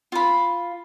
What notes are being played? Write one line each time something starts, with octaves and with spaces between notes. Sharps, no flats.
F4 B5